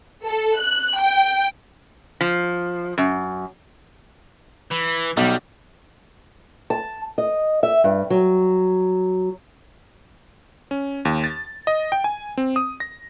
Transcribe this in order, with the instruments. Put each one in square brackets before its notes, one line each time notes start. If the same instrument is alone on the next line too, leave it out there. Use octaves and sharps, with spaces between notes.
[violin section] A4
F#6
G5
[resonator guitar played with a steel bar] F3
F#2
[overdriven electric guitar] E3
[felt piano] B1 [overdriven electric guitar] G3
[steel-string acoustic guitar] A5
D#5
E5
G2
F#3
[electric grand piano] C#4
D#2
A6
D#5
G5
G#5
C4
D#6
A#6